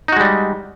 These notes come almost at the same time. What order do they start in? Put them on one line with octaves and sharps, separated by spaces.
D#4 F#4 G#3 G3